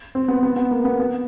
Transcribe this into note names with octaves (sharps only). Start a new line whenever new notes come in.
C4
B3
B3
B3
A#3
B3
B3